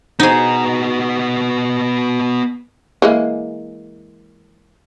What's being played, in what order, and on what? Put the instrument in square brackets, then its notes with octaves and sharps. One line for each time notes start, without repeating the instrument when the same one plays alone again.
[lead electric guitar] B3 F#4 [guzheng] D#4 G#4
[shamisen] E3 G#3 A#3